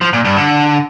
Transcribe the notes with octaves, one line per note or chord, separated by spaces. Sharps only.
F3
A#2
G2
D3